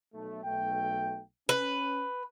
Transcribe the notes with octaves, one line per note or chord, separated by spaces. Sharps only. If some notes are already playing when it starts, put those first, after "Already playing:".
B1 A3
B1 A3 G5
C#4 B4